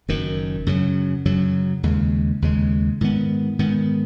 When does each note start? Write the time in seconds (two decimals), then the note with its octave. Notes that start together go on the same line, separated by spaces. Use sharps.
0.08 F#1 F#2 D#3
0.67 F#2 C#3 F#3
1.25 F#2 C#3 F#3
1.83 D#2 C#3 G#3
2.42 D#2 C#3 G#3
3.01 G#2 D#3 B3
3.59 G#2 D#3 B3